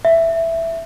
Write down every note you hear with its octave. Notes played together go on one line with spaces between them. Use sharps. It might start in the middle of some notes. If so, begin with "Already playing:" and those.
E5